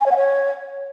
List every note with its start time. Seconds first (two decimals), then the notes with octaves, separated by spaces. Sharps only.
0.01 G#5
0.06 C#5
0.11 F#5
0.16 C#5